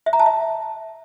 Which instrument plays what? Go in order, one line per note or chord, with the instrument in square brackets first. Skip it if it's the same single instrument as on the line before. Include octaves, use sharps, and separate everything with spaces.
[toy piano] E5
A#5
A5
E5